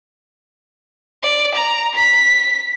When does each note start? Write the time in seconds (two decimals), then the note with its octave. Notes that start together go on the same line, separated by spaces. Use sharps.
1.23 D5
1.55 A#5
1.95 B6